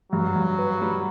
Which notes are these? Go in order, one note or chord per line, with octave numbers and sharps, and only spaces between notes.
G2 F#3
G2
B4
G3